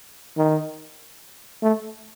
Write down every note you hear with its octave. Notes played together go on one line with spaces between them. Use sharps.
D#3
A3